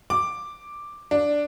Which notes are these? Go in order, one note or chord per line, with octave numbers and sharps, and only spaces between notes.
D6
D4